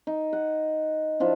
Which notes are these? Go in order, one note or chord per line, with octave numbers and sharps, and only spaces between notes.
D#4
F#5
F3 D4 E4